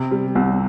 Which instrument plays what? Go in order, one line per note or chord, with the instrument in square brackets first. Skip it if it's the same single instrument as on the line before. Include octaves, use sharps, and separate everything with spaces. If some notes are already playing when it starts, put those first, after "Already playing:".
Already playing: [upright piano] C3
G3
C2